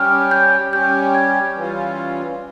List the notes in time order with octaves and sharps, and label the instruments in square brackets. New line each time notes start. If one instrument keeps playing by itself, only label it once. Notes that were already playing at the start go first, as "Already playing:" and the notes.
Already playing: [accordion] G3 C#4 G4 [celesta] F6
[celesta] G6
[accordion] G3 C#4 G4 [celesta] G6
[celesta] G#6
[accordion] E3 G3 C#4 F4